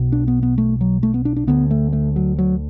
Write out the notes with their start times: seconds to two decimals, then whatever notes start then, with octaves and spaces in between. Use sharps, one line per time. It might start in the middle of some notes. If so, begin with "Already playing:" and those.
Already playing: B1 B2
0.12 D4
0.28 B3
0.43 B3
0.58 A3
0.81 F#3
1.03 A3
1.14 B3
1.25 D4
1.36 D4
1.47 D2 D3 B3
1.71 A3
1.93 A3
2.16 F#3
2.39 F#3